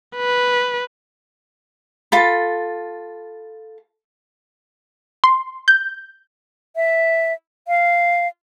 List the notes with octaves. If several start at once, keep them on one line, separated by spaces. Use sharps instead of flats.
B4
F4 A4 B5
C6
G6
E5
F5